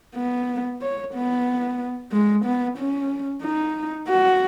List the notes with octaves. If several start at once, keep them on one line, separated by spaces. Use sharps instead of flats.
B3
C#5
B3
G#3
B3
C#4
D#4
F#4